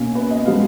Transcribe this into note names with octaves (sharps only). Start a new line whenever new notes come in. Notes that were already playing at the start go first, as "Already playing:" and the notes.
Already playing: B2 A#3 C#4
B4
D#5
F3 G#3 B3 F5